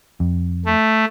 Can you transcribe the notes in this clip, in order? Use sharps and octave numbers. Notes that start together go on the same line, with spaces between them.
F2
A3